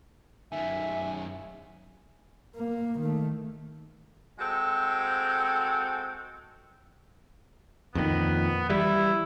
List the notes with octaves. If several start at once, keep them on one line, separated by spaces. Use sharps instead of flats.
F#2 D#3 E5 G#5
A#3
D#3 A3
G#3 C4 F#4 A4
F2 A#2 D#3 B3
E3 G3 E4